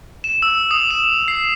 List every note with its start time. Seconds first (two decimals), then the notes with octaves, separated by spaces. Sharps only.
0.24 E7
0.42 E6
0.71 D#6
0.91 E7
1.28 C7